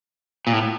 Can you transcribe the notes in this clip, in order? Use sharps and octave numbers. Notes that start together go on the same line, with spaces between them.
A#2
A2